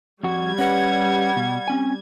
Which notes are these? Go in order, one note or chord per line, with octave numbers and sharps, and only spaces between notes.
F2 G3 F#4 G#6
C#4 B4 F#5
B2
C4 C#4 G#5